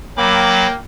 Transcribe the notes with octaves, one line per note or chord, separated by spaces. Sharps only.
F#3 A#3 G5 B5 D6